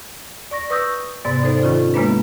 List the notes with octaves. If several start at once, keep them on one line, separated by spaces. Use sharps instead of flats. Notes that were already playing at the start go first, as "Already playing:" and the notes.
D5 C#6 A#6
B4 C#6 D#6 E6 G6 A#6
G#2 C3 B3 D5 A6
D#4 A4 C5 D5
D#3 C#4 F4 A4
C#3 G#3 A#3 B3 D4 B4